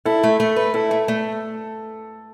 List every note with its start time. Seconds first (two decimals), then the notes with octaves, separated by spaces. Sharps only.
0.05 E4 A4
0.24 A3
0.40 A3
0.56 B4
0.74 E4 A4
0.91 A3
1.08 A3